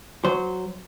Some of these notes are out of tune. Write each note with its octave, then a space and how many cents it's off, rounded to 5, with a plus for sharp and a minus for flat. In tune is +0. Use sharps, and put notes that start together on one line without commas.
F#3 -5 C5 -15